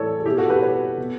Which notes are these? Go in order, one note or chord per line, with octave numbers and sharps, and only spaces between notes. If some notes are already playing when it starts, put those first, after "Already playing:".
Already playing: A2 E3 A4 C#5 D5
A4
B2 E4 G4
F#4 A4
G4 B4
A4 C#5
B2